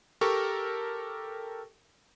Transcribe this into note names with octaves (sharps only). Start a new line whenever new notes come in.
G4 A4 A#4 C#6